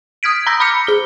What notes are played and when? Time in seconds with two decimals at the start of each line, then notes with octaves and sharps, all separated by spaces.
0.23 D#6 F6 G#6 B6 D7
0.46 A#5 B5 E6 G6 A#6
0.60 B5 D6 F6 G6 B6 C#7
0.87 G#4 G7